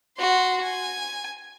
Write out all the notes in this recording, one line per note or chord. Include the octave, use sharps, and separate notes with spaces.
F#4 C6
G#5